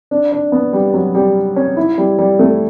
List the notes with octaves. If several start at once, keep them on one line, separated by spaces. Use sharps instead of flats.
D4
D4
B3
G3
F#3
G3
C#4
E4
G3
G3
A3